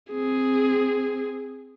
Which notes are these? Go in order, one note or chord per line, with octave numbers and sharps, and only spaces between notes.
C4 G#4